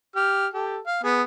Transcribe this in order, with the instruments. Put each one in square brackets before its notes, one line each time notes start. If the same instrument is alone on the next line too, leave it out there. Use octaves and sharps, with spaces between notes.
[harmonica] G4 F6
G4 A4
F5
B3 G#4